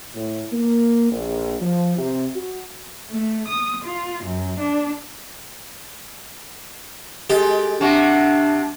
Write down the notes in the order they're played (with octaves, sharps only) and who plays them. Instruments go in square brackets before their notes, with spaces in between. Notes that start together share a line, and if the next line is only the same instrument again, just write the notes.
[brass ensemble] A2
A#3
A#1
F3
C3
F#4
[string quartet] A3
D#6
F4
F#2
D4
[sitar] G#3 [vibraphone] F#4 A4 D#5 [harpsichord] G4
[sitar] C3 F#4 [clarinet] D4 [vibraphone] E5